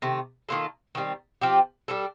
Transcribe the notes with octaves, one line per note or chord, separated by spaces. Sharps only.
C3 D#3 A3
D#3 A#3 F4 A4
D#3 G3 C4
F3 C4 G4
G3 D4 A4